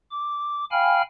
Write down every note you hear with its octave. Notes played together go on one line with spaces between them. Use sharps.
D6
F5 G5 G#5 B5 F6